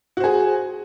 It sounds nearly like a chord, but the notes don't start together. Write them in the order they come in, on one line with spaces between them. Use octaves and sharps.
F#4 C5 G#4